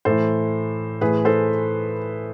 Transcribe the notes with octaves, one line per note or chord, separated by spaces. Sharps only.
A2 E3 A4 C5
A2 E3 G#4 B4
A4 C5